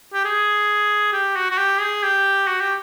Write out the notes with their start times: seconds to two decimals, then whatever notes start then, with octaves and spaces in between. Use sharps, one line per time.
0.13 G4
0.24 G#4
1.13 G4
1.36 F#4
1.51 F#4
1.58 G4
1.80 G#4
2.03 G4
2.47 F#4
2.61 G4